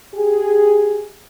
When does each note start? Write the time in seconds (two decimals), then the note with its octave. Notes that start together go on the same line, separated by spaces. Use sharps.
0.14 G4 G#4